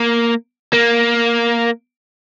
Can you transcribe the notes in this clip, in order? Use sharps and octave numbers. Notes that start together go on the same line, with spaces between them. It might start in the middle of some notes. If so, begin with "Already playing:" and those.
Already playing: A#3
A#3